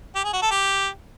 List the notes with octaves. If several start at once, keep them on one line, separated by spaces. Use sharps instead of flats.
G4
G#4
F#4
A4
G4